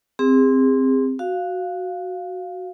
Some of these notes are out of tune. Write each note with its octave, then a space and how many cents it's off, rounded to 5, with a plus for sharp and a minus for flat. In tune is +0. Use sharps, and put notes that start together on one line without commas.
C4 +0 G#4 -35
F#4 +0 F5 +0